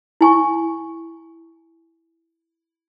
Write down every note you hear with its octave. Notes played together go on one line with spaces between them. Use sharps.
E4 G#5 C#6